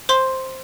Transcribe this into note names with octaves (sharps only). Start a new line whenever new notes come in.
C5 C6